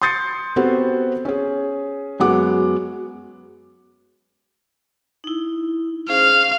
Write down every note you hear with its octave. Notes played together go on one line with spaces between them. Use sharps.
C6 D#6 G6 A6 C7 C#7
B3 C4 F#4 G4 A4 C5
C#4 G#4
F#2 F#3 G#3 B3 F#5 D6
D#4 E4
C#4 G#4 C5 F5